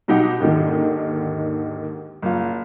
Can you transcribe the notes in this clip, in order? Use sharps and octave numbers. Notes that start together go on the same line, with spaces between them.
B2 F#3 D#4 G4 F#5
D#2 G#2 D3 D#3
F#1 F4